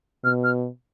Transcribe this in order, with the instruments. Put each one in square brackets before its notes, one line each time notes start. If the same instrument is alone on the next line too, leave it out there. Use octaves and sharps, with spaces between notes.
[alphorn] B2 [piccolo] F6
[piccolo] F6